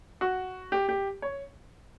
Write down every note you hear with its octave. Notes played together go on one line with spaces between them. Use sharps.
F#4
G4
G4
C#5